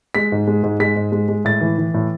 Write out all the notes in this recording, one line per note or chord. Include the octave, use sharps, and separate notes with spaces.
G#3 B6
G#2
G#3
G#2
G#3 B6
G#2
G#3
G#3
A2 A6
E3
E3
A2